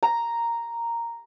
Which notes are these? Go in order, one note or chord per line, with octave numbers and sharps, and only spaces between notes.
A#5